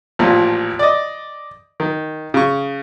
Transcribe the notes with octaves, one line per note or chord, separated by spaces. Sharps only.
A1 A#2 F3
D5 D#5
D#3
C#3 C#6